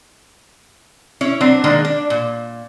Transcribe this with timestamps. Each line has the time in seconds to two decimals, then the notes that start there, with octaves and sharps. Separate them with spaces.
1.21 C#4 E4 C#5
1.41 F#3 C4 D4
1.64 D#3 G#3 A#3 D4
1.85 D4
2.10 A#2